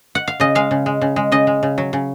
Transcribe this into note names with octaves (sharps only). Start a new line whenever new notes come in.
F#5
F5
C#3 D#5
G#3 F5
C#3
G#3
C#3
G#3
C#3 D#5
G#3
C#3
F#3
C#3